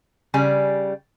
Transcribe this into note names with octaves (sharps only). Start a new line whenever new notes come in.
C#3 G3 G#5